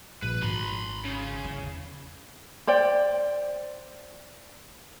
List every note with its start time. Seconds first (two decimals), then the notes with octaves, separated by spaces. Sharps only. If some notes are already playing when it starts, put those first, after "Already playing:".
0.22 A#1 B4
0.42 G#1 B5 C6
1.05 C#3
1.44 E2
2.67 C5 D5 G5